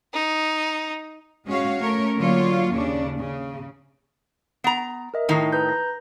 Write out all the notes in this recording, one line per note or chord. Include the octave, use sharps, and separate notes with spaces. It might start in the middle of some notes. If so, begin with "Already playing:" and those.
D#4
G#3 C#4 F#4 C#5 F5
A3 C#4 A#4 C#5
D3 F#3 A#3 F4 C#5
D#2 C#3 C#4 D4
C#3
B3 A#5
A#4 D#5 E5
A2 D#3 D#4
B4 A#5 G6
A#6